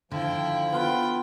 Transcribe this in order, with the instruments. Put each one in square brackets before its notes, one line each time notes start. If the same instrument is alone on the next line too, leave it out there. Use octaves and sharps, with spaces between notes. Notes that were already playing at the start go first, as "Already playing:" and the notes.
[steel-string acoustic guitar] D3 D#3 [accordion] F3 [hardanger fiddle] E4 G5
[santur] B3 F4 B4 [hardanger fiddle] G5